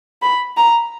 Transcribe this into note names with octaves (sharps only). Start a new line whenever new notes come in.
B5
A#5